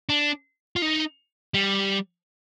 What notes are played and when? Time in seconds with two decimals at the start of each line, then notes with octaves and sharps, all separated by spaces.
0.09 D4
0.76 F4
0.82 D#4
1.54 G3